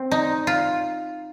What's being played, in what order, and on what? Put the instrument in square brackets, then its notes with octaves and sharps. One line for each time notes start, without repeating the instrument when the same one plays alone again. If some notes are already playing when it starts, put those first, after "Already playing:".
Already playing: [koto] C4
D#4
F4